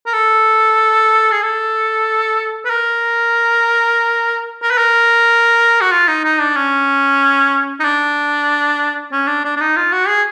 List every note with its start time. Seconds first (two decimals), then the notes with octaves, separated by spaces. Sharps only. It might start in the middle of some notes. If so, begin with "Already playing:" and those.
0.06 A#4
0.13 A4
1.32 G#4
1.43 A4
2.65 B4
2.70 A#4
4.63 A#4
4.71 B4
4.78 A#4
5.81 F#4
5.92 F4
6.08 D#4
6.24 D#4
6.40 D4
6.56 C#4
7.80 D#4
7.84 D4
9.12 C#4
9.28 D4
9.45 D4
9.57 D4
9.61 D#4
9.77 F4
9.93 F#4
10.08 G#4